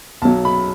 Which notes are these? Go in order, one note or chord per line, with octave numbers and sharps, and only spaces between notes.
B1 B2 F#3 A5
B5